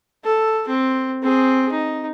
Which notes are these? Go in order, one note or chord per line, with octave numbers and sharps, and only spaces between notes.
A4
C4
C4 G#4
D#4